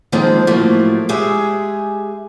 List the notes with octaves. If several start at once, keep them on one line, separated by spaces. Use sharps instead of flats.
D#3 F3 G#3 A#3 C4 A4
A2 F3 F#3 A3 A#3
G#3 G4 G#4 E5